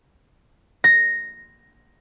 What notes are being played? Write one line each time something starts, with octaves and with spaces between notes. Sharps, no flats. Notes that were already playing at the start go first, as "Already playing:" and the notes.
A#6